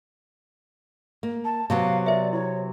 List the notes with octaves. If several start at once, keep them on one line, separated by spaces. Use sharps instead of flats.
A#3
A5
C3 F#3 B3 F5
C5 D5 E5
E4 C#5